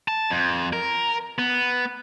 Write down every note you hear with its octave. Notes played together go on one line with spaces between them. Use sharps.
A5
F2
A#4
B3